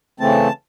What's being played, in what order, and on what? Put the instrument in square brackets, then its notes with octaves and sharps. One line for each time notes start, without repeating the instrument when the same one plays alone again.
[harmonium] C#3 E3 A3 C4 A5